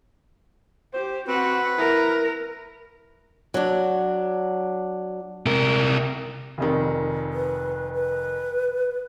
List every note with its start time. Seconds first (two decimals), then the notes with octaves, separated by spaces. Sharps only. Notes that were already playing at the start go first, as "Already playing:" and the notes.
0.94 G4 C5
1.28 C4 F#4 B4 F#5
1.78 E4 A#4 A#5
3.54 F#3 D4
5.46 C3 A#4
6.58 F1 F2 D#3
7.33 B4
7.95 B4